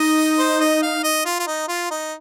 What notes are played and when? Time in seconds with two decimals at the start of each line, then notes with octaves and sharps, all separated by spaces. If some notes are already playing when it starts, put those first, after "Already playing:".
Already playing: D#4 D#5
0.38 C5
0.60 D#5
0.82 F5
1.04 D#5
1.25 F4
1.39 F4
1.47 D#4
1.68 F4
1.91 D#4